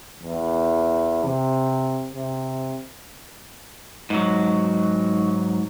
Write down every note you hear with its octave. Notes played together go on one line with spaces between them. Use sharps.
E2
C3
C3
G#2 F#3